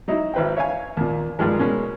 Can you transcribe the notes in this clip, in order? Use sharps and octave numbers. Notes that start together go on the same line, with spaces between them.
F#3 D#4 E4
G#1 E4 B4 C5 G5
C#5 E5 F5 G#5
D#2 A#2
G2 D#3 F3 G#3
B2 G#3 A#3 C#4